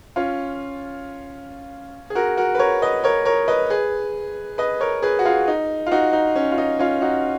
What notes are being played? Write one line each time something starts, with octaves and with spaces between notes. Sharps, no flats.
C#4 F4
G#4
F#4 A#4
F#4 A#4
B4
A#4 C#5
B4 D#5
A#4 C#5
A#4 C#5
B4 D#5
G#4 B4
B4 D#5
A#4 C#5
G#4 B4
F#4
F4 G#4
D#4
F4
D#4 F#4
D#4
C#4
F4
D#4
C#4 F4
D#4 F#4